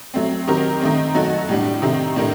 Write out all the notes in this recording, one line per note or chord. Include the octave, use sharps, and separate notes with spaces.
F#3 A3 C4
D#3 F#3 C4 G4 A#4
D#3 A3 C4
F#3 A3 D#4 F#4 A4
A2 G3 D4
C3 D#3 A3 C4
A2 A3 D4 G4 A#4